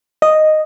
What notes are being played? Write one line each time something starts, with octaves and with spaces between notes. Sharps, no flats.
D#5